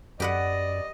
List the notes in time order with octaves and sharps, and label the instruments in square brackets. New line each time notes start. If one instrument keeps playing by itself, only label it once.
[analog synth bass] F#2 [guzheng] G4 B4 F#5 [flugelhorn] D5 [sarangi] D#5